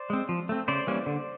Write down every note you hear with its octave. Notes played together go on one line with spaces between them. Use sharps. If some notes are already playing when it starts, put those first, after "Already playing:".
Already playing: C5 D5
G#3 C4
F3
A3 C4
C#3 C5 D5
E3 G3 A#3 C#4
D3